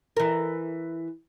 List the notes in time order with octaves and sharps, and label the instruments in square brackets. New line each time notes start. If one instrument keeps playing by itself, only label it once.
[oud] E3 A#4